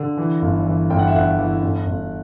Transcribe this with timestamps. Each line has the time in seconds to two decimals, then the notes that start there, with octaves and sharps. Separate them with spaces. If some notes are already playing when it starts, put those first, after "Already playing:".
Already playing: D3
0.17 E3
0.42 G1
0.66 E3
0.90 G1 G5
0.99 F#5
1.07 E5
1.14 G1 F#5
1.38 E3
1.62 G1
1.86 G1